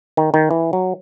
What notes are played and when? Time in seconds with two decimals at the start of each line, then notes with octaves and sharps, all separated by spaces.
0.17 D#3
0.34 D#3
0.51 E3
0.73 F#3